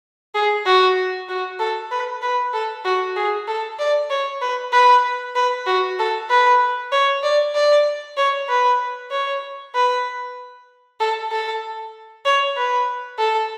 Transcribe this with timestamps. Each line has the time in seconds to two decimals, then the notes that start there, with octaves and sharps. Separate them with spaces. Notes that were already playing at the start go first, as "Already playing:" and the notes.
0.35 G#4
0.66 F#4
1.29 F#4
1.59 A4
1.91 B4
2.22 B4
2.53 A4
2.85 F#4
3.16 G#4
3.48 A4
3.79 D5
4.10 C#5
4.41 B4
4.72 B4
5.35 B4
5.66 F#4
5.99 A4
6.30 B4
6.92 C#5
7.23 D5
7.55 D5
8.17 C#5
8.49 B4
9.11 C#5
9.75 B4
11.00 A4
11.32 A4
12.25 C#5
12.57 B4
13.19 A4